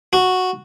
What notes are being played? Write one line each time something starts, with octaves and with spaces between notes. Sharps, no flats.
F#4